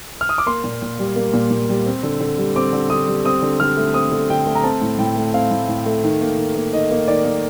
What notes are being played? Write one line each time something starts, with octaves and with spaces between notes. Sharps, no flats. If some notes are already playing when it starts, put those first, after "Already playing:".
F6
D#6
D6
A#3 C6
A#2
A#2
G3
A#3
A#2
A#2
G3
C4
D3
D3
G3
C4 D6
D3
D3 D#6
G3
C4 D#6
D3
D3 F6
A3
C4 D#6
D3
D3 G5
A3
A#5
C4 A5
A2
A2 G5
A3
C4 F5
A2
A2
A3
D#3
A#3
D#3
A#3
D#3 D#5
A#3
D#3 D5
A#3